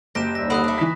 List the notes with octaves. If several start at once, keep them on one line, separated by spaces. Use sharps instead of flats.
F#1 G4 A#6 E7
D#2 G3 E5 A#6
D3 F#5 B5 D#6 F#6
A3 D4
E3 B6